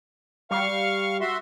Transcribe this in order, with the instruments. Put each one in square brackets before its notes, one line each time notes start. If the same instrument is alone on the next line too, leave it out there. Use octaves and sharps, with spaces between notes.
[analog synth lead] G3 [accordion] F5 C#6 F6
[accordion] F#4 E5 C6